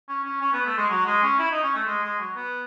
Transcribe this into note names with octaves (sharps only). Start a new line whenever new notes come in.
C#4
C#4
C#4
B3
A3
G#3
F#3
G#3
C#4
E4
D#4
C#4
A3
G#3
G#3
F#3
B3